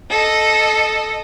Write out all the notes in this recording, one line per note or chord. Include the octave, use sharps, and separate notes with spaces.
A4 D#5